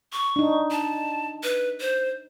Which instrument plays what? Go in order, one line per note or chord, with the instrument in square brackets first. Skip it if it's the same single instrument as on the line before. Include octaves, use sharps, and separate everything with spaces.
[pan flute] C#6
[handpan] D4 D#4
[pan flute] A5
B4
C5